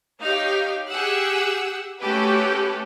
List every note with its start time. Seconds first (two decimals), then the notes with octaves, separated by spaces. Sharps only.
0.22 D#4 G4 C#5 F5
0.89 G4 G#4 F#5 E6 F#6
2.02 A3 C#4 F#4 G4 A4 B4